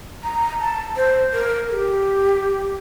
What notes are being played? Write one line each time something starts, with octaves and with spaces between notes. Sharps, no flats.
A#5
A5
C5
A#4
A4
G4